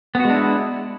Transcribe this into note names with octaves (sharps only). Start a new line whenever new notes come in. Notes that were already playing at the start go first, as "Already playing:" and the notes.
G#3 B3 D4 E4 F#4